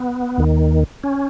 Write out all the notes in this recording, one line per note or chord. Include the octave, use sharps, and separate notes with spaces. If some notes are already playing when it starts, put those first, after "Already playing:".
Already playing: B3
D#2 D#3
C#4